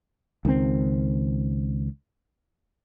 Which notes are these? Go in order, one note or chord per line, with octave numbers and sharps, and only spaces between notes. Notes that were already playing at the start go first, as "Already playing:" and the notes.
C#2 D#3 G3 C4